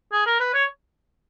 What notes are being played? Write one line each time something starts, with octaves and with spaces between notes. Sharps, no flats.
G#4
A#4
B4
C#5